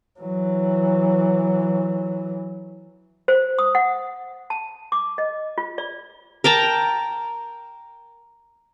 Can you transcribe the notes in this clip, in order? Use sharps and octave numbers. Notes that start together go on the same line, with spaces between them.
E3 F#3
C5
D#6
F#5
A5
D6
D#5
F4
D5
A#4 G5 A5 A#5